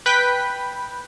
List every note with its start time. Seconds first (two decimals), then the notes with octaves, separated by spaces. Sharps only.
0.06 B4 G5 B6